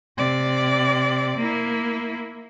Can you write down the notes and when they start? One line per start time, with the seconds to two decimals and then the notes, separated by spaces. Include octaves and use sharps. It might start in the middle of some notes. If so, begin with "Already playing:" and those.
0.17 C3 D5
1.37 A#3 E4